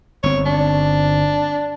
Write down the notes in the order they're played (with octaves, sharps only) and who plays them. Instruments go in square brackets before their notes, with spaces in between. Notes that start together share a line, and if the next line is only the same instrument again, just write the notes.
[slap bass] G1 C4 [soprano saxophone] C#5
[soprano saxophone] D4